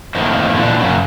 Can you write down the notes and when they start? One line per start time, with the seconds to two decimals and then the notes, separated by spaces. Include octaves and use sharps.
0.15 F2 A2 D#3 A#3
0.53 A#2 D3 E3 D4
0.79 F#2 C#3 F#3